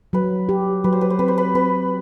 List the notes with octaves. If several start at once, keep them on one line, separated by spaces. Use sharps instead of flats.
F#3 B4
G4
F#3 B4
C5
B4
C5
C4 B4
C5
B4
C4 B4